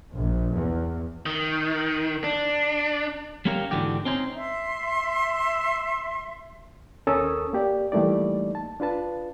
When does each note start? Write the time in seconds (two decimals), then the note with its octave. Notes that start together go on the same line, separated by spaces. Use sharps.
0.14 A#1
0.53 E2
1.26 D#3
2.24 D4
3.45 G3 A#3 C#4 G4 A#4 F5
3.71 G#2 D3 E3 F#4 G4
4.05 C4 C#4 D#4 C5
4.35 E5 C6
7.07 D#2 C#4 A4 A#4 D#6 E6
7.53 A#3 G4 D5
7.92 E3 G3 A3 A#3 D#4 D5
8.55 A5
8.80 D4 F4 B4 A5